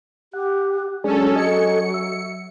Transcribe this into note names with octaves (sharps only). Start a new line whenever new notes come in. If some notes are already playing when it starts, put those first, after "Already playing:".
G4 F#5
F#3 G#3 C#4 D4 G#4 A4
A4 D#5 G#5 C#7
E5